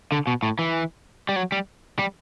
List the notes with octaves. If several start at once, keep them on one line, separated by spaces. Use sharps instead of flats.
D3
B2
A2
E3
G3
F#3
G3
G3